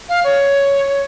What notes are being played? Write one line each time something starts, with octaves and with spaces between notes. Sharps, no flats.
F5
C#5